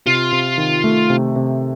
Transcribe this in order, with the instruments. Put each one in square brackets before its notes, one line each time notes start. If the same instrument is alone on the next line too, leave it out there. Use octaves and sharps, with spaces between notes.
[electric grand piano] C3 [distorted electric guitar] F4
[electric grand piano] C3
D#3
A3
C3
C3